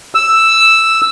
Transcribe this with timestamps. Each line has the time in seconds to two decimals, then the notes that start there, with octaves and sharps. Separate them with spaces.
0.15 E6